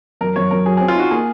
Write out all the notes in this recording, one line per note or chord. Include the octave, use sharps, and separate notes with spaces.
F#2 A#4
F#2 C#5
F#2 A#4
F#3 G#4
G#4
C4
F4
D#4 F#4
A#3 G#4